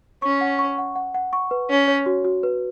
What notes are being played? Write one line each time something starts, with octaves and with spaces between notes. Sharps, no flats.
C#4 C#6
F#5
C#6
F#5
F#5
F#5
C#6
B4
C#4 C#5
C#5
F#4
F#4
B4